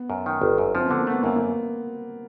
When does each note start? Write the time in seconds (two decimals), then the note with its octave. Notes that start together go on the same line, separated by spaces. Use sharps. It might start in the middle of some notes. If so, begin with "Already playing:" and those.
Already playing: B3
0.10 F#2
0.26 D#3
0.42 G1
0.58 F#2
0.75 F3 C4
0.86 D3 B3
0.98 A#3
1.07 A3 B3
1.23 F#2 A#3
1.36 A#3